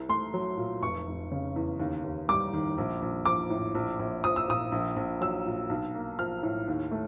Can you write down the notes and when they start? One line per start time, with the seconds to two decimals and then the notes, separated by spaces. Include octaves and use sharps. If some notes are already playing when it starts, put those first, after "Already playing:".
Already playing: C2
0.09 A3 C6
0.34 F#3
0.57 A#2
0.82 F1 C#6
1.07 F1
1.32 C#3
1.56 E2
1.80 D#2
2.04 D#2
2.29 G3 D6
2.53 D#3
2.78 A#1
3.02 A#1
3.25 F3 D6
3.50 A2
3.75 A#1
3.99 A#1
4.24 F3 D#6
4.36 E6
4.48 A#2 D#6
4.72 A#1
4.96 A#1
5.21 F#3 E6
5.46 A#2
5.69 B1
5.95 A#3
6.19 F3 F6
6.43 A2
6.68 D#2
6.91 A3